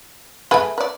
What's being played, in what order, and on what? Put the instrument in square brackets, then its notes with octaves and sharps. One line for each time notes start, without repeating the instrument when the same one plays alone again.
[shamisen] A3 G#4 B4 [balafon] E5 G#5
[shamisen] B4 D5